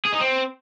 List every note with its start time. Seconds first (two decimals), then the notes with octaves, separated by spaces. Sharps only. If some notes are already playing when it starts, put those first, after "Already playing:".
0.05 G#4
0.12 D#4
0.20 C4